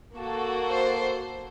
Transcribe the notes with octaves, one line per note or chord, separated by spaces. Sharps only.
A#3 F#4 A4
C5